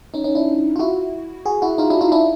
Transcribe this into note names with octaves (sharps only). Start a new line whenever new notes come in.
C#4 D#4
C#4 D#4
D4 E4
F4
E4 F#4
F#4 G#4
E4 F#4
D#4 F4
D4 E4
D#4 F4
D4 E4